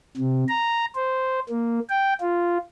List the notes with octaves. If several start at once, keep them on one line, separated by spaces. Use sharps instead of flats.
C3
A#5
C5
A#3
G5
F4